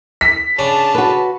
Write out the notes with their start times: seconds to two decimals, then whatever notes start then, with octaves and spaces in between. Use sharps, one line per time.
0.21 B6
0.59 C#3 D4 A5
0.95 F#4 B4